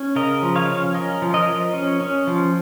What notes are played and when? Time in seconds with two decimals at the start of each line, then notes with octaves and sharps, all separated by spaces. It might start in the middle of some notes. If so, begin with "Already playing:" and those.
Already playing: C#4
0.16 C#3 A#4 D#5
0.43 F3
0.55 C#5 F5
0.69 C#4
0.95 C#4 A#4 D#5
1.22 F3
1.34 A#4 D#5
1.48 F3
1.73 C#4
2.00 C#4
2.27 F3